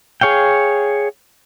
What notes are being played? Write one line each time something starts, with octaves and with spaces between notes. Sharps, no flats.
G#4 C#5 F5 G5